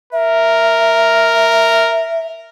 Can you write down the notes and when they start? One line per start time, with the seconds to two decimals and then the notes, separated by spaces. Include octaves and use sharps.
0.13 A#4 E5